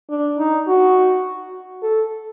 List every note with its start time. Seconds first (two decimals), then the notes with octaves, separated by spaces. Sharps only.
0.10 D4
0.38 D#4
0.67 F#4
1.82 A4